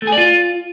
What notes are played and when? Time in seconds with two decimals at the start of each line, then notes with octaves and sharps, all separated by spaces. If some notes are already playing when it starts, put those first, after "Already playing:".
0.02 A3
0.07 G#4
0.12 D5
0.18 F4